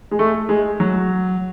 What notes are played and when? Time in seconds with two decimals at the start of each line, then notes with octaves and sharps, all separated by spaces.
0.11 G#3
0.19 A3
0.49 G#3
0.80 F#3